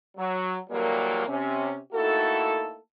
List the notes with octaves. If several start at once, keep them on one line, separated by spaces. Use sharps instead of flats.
F#3
A#2 D3 E3 F#3 G3 A#3
C3 C#4
A3 A#3 D#4 E4 F#4 A4